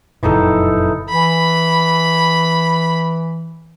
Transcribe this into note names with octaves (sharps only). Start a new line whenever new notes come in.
F#1 F2 A#2 E3 D#4 A4
E3 B5